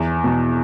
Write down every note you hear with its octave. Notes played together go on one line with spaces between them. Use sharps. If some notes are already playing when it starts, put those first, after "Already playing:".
Already playing: E2 E3
B2